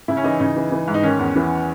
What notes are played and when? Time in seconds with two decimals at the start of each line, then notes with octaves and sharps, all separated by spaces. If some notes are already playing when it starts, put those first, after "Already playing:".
0.08 C#3 E4
0.17 C#4
0.24 E3 D#4
0.40 C#3 D#4
0.56 E3
0.72 E3
0.88 G#2
0.94 D#4
1.03 D#3 C#4
1.19 E2
1.36 E3